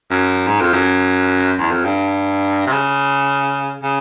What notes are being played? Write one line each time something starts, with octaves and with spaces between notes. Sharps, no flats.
F#2
G#2
F2
F#2
E2
F2
G2
C3
C#3
C#3